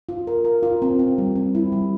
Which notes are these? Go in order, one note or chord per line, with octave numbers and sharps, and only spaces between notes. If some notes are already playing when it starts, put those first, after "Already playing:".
F4
A#4
A#4
F4
C4
C4
G3
C4
E4
G3